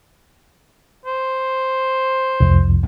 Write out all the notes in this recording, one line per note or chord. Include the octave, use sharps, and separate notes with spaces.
C5
C2 F2